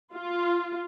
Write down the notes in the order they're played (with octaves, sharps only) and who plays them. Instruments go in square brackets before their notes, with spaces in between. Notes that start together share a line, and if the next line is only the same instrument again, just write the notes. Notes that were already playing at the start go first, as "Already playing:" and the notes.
[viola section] F4